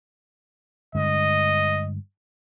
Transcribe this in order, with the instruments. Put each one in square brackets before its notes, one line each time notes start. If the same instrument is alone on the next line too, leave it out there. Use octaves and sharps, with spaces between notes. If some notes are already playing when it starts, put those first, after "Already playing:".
[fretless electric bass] G2 D3 G#3 [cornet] D#5